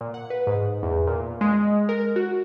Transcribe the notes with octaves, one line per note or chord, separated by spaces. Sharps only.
A#2
F#5
B4
G#2
E2
A#2
G#3
A#4
F#4